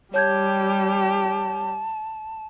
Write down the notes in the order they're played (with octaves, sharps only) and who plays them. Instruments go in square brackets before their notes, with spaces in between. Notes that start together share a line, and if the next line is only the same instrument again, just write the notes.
[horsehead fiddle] G3 G4 [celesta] C#5 G6 G#6 [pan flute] A5